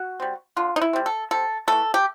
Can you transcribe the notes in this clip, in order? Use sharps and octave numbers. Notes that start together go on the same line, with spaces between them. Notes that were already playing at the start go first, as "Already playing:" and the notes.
Already playing: F#4
G3 C4
D3 F4
D#4
E4
G3 C4
A4
C3 A4
E3 A3 A4
G4